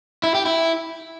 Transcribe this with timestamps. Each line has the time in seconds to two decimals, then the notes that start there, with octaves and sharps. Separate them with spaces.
0.24 E4
0.35 G4
0.46 E4